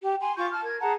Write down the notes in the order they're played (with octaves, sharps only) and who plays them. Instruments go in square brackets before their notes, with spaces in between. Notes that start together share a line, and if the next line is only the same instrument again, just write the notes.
[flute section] G4
G#5 C6
F4 C#6 D6 G6
A5 F6
A#4 G#6
G#4 F#5 A5 A#5